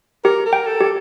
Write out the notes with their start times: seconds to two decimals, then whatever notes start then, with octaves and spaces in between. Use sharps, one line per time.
0.24 G4 A#4
0.46 A#4
0.53 G5
0.67 A4
0.81 G4